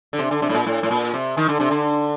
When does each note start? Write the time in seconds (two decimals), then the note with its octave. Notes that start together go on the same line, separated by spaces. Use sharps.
0.13 D3
0.19 C3
0.31 D3
0.42 C3
0.49 A2
0.54 A#2
0.67 A2
0.83 A2
0.91 A#2
1.14 C3
1.37 D#3
1.49 D3
1.60 C3
1.71 D3